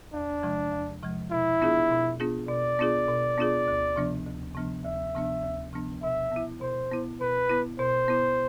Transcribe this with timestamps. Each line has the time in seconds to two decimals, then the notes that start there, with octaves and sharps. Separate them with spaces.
0.13 E2 D4
0.43 C3 F3 G#3
0.73 E2
1.02 C3 F3 G#3
1.31 B2 E4
1.61 B3 D4 F4 G#4
1.91 B2
2.20 B3 D4 F4 G#4
2.49 B2 D5
2.79 B3 D4 F4 G#4
3.09 B2
3.38 B3 D4 F4 G#4
3.68 D2
3.96 C3 F3 B3 D4
4.26 D2
4.55 C3 F3 B3 D4
4.85 D2 E5
5.15 C3 F3 B3 D4
5.43 D2
5.73 C3 F3 B3 D4
6.03 B2 E5
6.32 B3 E4
6.62 B2 C5
6.92 B3 E4
7.20 B2 B4
7.49 B3 E4
7.79 B2 C5
8.08 B3 E4